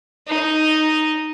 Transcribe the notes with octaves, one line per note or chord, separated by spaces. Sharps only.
D#4